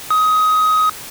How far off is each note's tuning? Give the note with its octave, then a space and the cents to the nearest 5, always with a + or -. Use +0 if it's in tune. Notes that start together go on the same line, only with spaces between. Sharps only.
D#6 +20